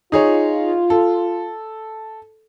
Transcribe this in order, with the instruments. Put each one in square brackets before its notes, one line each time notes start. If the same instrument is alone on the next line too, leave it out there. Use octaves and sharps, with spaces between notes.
[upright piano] D#4 G#4 C#5 [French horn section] F4
[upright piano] A4